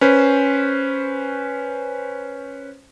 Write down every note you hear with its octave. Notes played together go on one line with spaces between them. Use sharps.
C#4 B4 C5